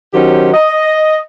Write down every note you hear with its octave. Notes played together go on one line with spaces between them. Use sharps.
D#3 F#3 C#4 G4 C5
D#5